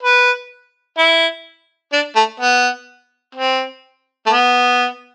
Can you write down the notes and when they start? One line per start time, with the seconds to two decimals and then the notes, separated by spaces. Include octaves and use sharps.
0.03 B4
0.98 E4
1.93 D4
2.16 A3
2.40 B3
3.35 C4
4.26 A3
4.30 B3